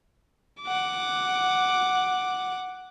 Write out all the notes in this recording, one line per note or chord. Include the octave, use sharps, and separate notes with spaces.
F#5 D6